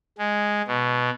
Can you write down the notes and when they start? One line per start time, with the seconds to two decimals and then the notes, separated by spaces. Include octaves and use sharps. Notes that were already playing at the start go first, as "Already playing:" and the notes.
0.18 G#3
0.68 B2